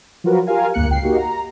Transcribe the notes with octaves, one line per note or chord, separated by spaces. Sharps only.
F3 F#3 F4 F#4 A#4 B4
F4 G4 A#4 F5 G#5
D2 G2 A#3 F#6 C#7
C#2 G5 C7
A#3 D#4 F#4 G4
A#5